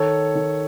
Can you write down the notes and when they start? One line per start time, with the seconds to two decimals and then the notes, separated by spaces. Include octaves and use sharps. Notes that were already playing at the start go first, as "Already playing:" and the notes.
Already playing: D#3 A4 C#5
0.35 D#3